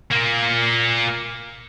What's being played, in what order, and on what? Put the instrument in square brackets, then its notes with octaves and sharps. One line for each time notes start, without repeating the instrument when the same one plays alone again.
[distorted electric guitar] A#2 A#3